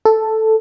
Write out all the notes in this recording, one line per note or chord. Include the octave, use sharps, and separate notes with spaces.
A4